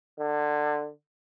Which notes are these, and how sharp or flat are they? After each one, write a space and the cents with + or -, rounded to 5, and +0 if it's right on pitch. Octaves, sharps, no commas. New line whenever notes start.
D3 +20